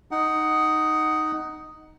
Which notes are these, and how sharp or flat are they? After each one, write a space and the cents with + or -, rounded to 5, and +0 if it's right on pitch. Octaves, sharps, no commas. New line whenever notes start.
D#4 +0 F#5 +15